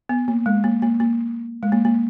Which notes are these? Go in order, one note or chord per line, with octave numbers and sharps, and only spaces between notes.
B3
A#3
G#3
A#3
A#3
A#3
G#3
A#3
A#3